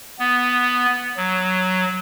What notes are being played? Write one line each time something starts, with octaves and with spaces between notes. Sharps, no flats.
B3
F#3